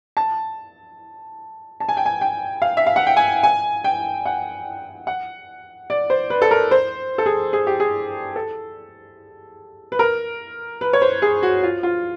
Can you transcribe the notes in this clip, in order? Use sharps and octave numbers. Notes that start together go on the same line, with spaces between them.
A5
A5
G#5
G5
G#5
G5
F5
E5
F5
F#5
G5
G#5
G#5
G5
F#5
F#5
D5
C5
B4
A4
A#4
C5
A4
G#4
G#4
G4
G#4
A4
B4
A#4
B4
C#5
C5
G#4
F#4
F4
F4